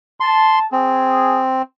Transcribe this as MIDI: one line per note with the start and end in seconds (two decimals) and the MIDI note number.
0.20 0.64 81
0.20 0.59 84
0.72 1.62 60
0.72 1.42 68